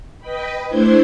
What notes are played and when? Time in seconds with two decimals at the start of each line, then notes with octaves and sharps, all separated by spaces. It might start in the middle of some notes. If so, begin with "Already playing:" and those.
0.20 B4 D#5 G5 B5
0.67 A3 D4 E4 C5 G6 G#6